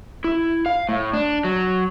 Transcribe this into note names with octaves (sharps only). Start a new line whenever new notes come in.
E4
F5
A2
D4
F#3